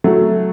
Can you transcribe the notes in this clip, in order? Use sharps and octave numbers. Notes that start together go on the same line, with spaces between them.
F#3 A3